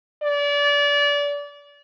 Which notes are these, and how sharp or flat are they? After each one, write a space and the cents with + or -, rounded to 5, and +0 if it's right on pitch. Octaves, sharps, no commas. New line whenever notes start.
D5 -30